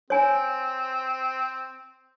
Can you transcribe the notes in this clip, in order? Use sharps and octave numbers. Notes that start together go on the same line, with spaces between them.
C4 C#5 G#5